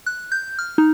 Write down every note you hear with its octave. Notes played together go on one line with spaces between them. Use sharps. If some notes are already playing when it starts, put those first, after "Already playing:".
F#6
G6
F6
D#4